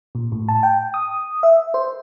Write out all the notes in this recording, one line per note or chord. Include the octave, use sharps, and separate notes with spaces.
A#2
A2
A5
G5
D#6
E5
C5